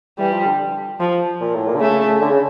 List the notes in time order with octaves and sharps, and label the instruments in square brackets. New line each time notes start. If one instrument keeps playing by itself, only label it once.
[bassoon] E3 [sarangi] G3
[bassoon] F3
D3
[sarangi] F3
[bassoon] A#2
A2
A#2
D3
[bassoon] C#3 [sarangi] A3
[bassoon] D3
C#3